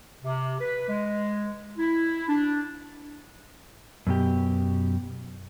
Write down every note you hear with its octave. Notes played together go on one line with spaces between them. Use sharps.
C3
B4
G#3
E4
D4
F#2 B2 G4